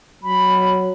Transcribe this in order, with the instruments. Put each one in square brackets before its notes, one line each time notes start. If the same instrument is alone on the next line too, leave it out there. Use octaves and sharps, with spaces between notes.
[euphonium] F#3 [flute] B5